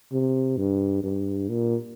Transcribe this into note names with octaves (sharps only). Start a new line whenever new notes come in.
C3
G2
G2
A#2